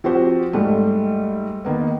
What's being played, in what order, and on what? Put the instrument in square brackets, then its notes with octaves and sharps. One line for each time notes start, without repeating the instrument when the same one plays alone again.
[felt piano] F3 C4 F#4 G4 C5
G#2 G3 A3
D#3 A#3 B3